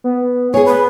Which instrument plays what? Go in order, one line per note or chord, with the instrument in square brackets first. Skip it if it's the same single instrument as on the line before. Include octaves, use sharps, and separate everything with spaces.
[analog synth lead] B3
[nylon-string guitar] G#4 C#5 [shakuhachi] G#5
[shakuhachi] B3 [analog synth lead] B4